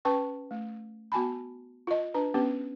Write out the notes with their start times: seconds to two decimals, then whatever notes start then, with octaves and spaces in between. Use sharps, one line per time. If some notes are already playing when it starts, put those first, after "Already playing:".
0.05 C#4 B4 G5 A5 C#6
0.51 A3
1.12 B3 F#4 G#5 A5 B5
1.87 F4 D#5
2.14 D4 B4 A#5
2.34 B3 C#4 G4 B4